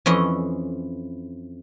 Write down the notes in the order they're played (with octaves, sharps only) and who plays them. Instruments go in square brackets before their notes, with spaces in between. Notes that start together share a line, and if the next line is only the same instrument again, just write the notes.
[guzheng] F2 E3 C#4 D#5